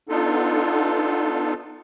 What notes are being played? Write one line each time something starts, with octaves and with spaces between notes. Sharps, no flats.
B3 D4 D#4 F4 A4